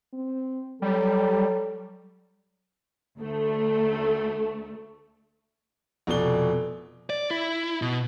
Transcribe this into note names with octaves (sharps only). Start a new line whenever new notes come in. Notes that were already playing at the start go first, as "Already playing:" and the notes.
C4
F#3 G3 A4
D2 A3
F1 B2 D5 G7
D5
E4
B2